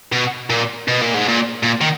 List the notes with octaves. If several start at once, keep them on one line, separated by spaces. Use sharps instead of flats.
B2
A#2
B2
A#2
G#2
A#2
A#2
D#3